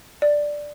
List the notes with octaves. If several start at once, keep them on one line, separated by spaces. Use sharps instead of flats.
D5